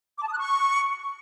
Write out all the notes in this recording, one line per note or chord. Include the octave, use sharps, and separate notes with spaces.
D6
A5
D#6
F#6
C#6